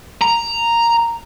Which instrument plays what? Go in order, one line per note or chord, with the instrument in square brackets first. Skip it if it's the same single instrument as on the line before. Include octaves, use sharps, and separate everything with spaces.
[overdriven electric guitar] A#5